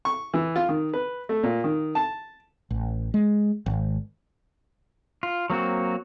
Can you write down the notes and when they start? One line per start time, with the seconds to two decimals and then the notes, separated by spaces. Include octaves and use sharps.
0.05 C#6
0.34 E3
0.56 F4
0.69 D#3
0.93 B4
1.29 A3
1.43 A#2
1.64 D#3
1.95 A5
2.70 A1
3.14 G#3
3.66 G#1
5.23 F4
5.50 F#3 A#3 C4 F#4